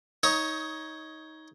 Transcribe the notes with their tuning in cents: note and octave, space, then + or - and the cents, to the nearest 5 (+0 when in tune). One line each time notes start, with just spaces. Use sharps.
D#4 +20 C#5 +0 D#6 +35